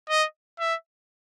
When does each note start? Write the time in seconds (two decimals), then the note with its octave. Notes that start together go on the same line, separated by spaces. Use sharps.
0.10 D#5
0.60 E5